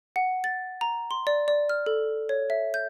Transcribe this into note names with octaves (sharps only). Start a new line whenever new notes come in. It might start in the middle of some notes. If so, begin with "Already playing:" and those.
F#5
A6
A#5
C6
D5
D5
F6
A4
C#5
E5
G6